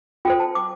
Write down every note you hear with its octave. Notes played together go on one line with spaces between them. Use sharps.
F4 A4 C5 G5
A5
D6